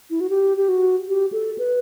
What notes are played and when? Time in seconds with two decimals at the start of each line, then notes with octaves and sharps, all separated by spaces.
0.10 E4
0.21 F#4
0.30 G4
0.57 G4
0.68 F#4
1.08 G4
1.32 A4
1.58 B4